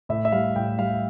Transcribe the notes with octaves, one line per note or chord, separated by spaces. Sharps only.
A2 E5
E5
G3 F5
A2 G5
G3 F5